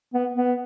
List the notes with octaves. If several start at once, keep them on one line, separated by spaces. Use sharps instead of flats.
B3
B3